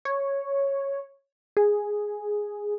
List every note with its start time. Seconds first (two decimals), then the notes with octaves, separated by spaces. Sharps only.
0.05 C#5
1.57 G#4